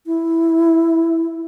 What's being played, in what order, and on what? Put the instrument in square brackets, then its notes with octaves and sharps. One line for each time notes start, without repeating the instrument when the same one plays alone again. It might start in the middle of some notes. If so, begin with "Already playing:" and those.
[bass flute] E4